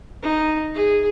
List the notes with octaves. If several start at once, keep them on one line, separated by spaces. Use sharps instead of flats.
D#4
G#4